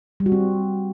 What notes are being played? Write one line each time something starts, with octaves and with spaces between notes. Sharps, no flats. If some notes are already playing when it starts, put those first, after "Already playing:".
G3
F#4
C4